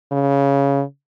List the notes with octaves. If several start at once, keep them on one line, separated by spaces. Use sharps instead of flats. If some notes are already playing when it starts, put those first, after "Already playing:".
C#3